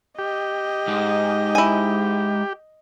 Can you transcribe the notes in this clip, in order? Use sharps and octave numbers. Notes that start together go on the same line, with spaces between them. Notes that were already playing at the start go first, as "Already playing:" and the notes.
G4 D#5
G#2
E4 G#5